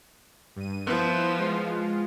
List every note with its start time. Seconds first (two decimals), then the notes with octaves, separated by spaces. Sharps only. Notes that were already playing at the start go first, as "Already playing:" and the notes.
0.56 G2 D#7
0.87 F3 B3 E4 B4 E7
1.39 G#3 F4